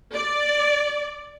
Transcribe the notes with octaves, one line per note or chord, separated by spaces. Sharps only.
D5